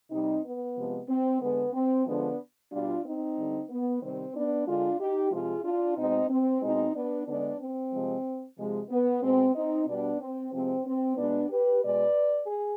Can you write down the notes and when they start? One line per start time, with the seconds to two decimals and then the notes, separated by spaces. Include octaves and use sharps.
0.10 C3 G3 C4 D#4
0.43 B3
0.76 C3 F3 G#3
1.08 C4
1.41 D3 G#3 B3
1.73 C4
2.06 D3 F3 G#3 B3 D4
2.71 B2 G3 D4 F4
3.04 C4 D#4
3.36 D3 G3
3.69 B3
4.02 C3 D#3 G3 C4
4.34 B3 D4
4.66 D3 G#3 D4 F4
4.99 D#4 G4
5.31 C3 F3 G#3 F4 G#4
5.63 D4 F4
5.96 B2 G#3 C4 D#4
6.29 C4
6.62 B2 G#3 C4 D#4
6.94 B3 D4
7.26 D3 G#3 B3 D4
7.59 C4
7.92 C3 F3 G#3
8.56 C3 F3 G#3
8.89 B3
9.22 B2 G#3 C4
9.54 C4 D#4
9.86 B2 G3 B3 D4
10.20 C4
10.52 C3 F3 G#3 C4
10.85 C4
11.17 B2 G#3 B3 D4
11.49 G4 B4
11.82 B2 G#3 B4 D5
12.47 G#4